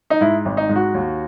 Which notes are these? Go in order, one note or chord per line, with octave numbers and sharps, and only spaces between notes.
D#4
G#2 E4
G#1
D#4
G#2
F#4
D#2